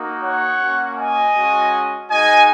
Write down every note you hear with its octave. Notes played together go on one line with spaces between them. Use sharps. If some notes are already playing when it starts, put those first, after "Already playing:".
Already playing: A#3 D#4 F#4
C#5 F#5
A#3 C#4 F#4
D#5 G#5
G#3 C#4 F#4
G#3 D#4 F#4 D#5 G#5